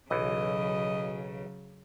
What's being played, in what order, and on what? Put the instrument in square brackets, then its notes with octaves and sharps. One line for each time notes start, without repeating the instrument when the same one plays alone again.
[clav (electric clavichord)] B1 E3 [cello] C#3 F#3 [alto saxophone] D#5